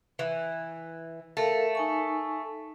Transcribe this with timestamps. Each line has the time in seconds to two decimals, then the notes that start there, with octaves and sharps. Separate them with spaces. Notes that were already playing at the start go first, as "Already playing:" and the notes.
0.19 E3
1.37 A3 A4 A#4 F5
1.75 D#4 G#5 C#6